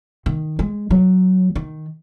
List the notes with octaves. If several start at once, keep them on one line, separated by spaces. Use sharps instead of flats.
D#3
G#3
F#3
D#3